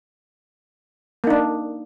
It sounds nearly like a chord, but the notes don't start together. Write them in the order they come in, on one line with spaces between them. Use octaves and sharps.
A#3 D#4 D4